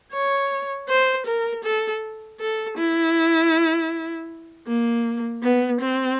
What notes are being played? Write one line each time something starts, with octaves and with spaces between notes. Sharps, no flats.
C#5
C5
A#4
A4
A4
E4
A#3
B3
C4